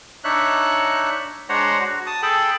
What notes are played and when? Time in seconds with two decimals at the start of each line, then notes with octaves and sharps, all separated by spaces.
0.24 D4 D#4 C#5 E5 F#6
1.49 G#3 D4 C5 C#5 F#5 A#5
1.81 F#4
2.07 A5 D#6
2.23 G#4 A4 G5 A5 B5